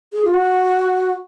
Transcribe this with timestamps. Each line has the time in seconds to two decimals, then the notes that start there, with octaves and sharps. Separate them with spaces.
0.13 G#4
0.25 F4
0.34 F#4